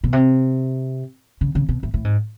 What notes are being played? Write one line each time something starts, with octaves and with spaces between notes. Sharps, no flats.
B2
C3
C#3
C#3
B2
A2
A2
G#2